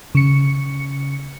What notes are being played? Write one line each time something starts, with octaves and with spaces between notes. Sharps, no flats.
C#3 C#7